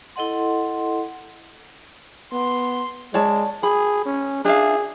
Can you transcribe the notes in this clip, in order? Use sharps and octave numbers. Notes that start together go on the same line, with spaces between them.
E4 A4 D#5 F#5 C6
B3 C6
G#3 C#5 D5 A5
G#4 B5
C#4
D4 G#4 E5 F5